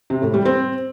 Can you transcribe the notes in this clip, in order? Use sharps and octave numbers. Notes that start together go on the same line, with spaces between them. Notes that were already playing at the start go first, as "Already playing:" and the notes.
C3
A2
G3
C4